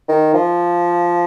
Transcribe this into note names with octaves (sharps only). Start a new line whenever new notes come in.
D#3
F3